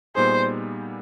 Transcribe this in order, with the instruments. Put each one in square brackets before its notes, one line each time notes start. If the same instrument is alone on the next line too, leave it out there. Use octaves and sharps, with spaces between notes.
[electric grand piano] A#2 G3 B3 D#4 G#4 [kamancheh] C5